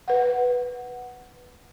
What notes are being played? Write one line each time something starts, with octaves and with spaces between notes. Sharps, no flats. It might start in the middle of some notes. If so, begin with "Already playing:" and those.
B4 F#5